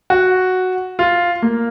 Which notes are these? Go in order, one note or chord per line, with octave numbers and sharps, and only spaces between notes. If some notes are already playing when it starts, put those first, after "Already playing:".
F#4
F4
A#3